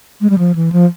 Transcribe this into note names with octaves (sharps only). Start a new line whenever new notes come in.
G#3
G3
F3
E3
F3